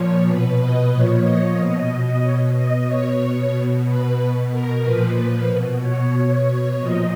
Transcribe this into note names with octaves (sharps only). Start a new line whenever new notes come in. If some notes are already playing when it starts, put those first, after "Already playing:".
Already playing: A#2 F3 C#5
B2 B4
D#5
A#2 F3 C#5
D#5
B2 D#5
B2 C#5
D#5
B2 C#5
B2
B4
B2 B4
A#4
A#2 F3 B4
B2
C#5
B2 C#5
A#2 F3 D#5